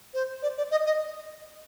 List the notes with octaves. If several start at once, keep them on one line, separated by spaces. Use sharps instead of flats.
C5
D5
D5
D#5
D#5